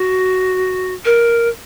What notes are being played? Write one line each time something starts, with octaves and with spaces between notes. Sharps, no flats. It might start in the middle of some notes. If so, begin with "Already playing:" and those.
Already playing: F#4
A#4